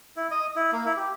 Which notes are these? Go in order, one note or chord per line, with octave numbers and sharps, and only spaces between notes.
E4
D#5
E4
A#3
E4
G4